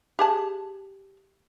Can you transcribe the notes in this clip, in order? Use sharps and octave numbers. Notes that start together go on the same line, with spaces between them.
G4 G#4 A5